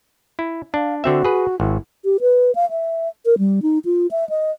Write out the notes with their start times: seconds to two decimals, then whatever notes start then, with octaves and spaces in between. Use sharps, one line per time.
0.39 E4
0.74 D4 F5
1.04 D3 C4 F#4 E5
1.25 G#4 B4
1.60 G#1 E4
2.05 G4
2.21 B4
2.55 F5
2.70 E5
3.26 A#4
3.38 G3
3.62 D#4
3.85 F4
4.11 E5
4.29 D#5